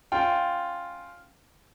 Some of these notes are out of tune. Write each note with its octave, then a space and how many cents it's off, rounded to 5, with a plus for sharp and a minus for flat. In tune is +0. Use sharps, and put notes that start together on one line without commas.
C#4 +0 F4 +0 G5 -10